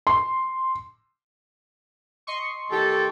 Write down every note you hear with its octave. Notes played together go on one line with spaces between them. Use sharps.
C6
D#5 C6 C#6
A2 D#3 G4 A4